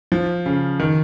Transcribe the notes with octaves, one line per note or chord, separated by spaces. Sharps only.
F3
C#3
D#3